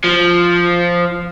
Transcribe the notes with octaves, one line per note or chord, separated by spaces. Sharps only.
F3